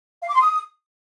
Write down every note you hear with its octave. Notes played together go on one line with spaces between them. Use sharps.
F5
D6
C6
D#6